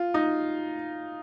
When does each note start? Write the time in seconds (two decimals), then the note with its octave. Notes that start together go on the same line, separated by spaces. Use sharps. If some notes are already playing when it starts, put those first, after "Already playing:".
Already playing: F4
0.14 D#4